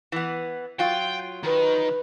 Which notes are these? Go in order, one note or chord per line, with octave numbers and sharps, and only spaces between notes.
E3 B3
F#3 F4 G5
D#3 B4